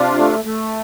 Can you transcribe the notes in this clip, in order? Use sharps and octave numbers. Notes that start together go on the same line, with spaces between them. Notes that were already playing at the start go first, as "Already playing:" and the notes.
Already playing: C3 D4 F4
A3
A3